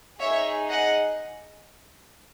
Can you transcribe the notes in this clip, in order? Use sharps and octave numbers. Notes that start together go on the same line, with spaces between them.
D#4 G#4 C#5 E5
D#5 F#5